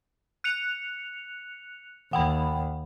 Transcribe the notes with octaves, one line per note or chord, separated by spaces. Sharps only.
F#6 C#7 F7
D#2 F#5 G5 B5